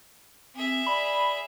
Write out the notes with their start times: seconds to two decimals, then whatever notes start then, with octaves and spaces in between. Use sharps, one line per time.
0.55 C4 G#4 E5
0.86 D5 B5